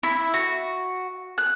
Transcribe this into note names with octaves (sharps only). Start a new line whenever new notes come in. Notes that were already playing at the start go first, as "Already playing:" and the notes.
E4
F#4
F#6